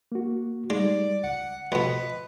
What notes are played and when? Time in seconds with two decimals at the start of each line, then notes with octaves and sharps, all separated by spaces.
0.12 A#3 F#4
0.70 G3 G#3 D#4 D5
1.24 C#2 F#5
1.72 F2 B2 B4 D#5